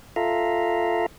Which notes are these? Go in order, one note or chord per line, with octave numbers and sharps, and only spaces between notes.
F4 A4 E5 F5 A#5